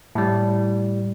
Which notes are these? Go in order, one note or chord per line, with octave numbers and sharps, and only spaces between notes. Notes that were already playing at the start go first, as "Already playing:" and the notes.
A2 G3